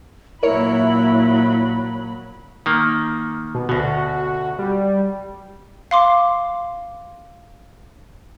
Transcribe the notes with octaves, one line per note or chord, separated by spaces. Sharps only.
A#2 F#3 E4 A#4 C#5 B5
D#3 A#3
B2
D2 B2 F#4
G3
F5 C6 D6